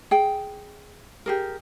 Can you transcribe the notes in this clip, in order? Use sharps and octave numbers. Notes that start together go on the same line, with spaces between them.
G#4 G5
G4 G#4 A#4